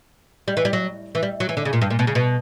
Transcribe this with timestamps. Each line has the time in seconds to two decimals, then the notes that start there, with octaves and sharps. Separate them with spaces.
0.48 G3
0.57 E3
0.65 G3
0.73 F#3
1.15 E3
1.23 G3
1.40 F#3
1.49 E3
1.57 D3
1.65 C#3
1.73 A#2
1.82 G2
1.90 A#2
1.99 B2
2.07 C#3
2.15 B2